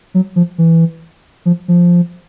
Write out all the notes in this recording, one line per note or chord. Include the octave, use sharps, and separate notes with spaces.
F#3
F3
E3
F3
F3